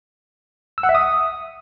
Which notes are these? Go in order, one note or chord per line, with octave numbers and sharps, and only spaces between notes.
E6
F#5
E5
D#6